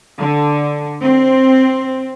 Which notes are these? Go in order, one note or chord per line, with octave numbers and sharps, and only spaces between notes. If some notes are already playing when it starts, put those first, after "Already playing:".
D3
C4